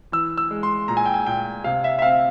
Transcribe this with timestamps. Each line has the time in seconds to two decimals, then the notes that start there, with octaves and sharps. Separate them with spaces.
0.12 E3 E6
0.38 E6
0.51 G#3
0.63 C6
0.88 A#2 A#5
0.97 G#5
1.05 G5
1.14 G#5
1.26 A#2 G5
1.64 C3 F5
1.84 E5
1.99 E5
2.02 C4 F5